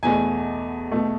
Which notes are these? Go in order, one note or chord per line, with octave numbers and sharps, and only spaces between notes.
E2 B2 A3 G#5
B2 A3